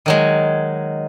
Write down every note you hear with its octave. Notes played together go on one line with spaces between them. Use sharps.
D#3 F#3 G#3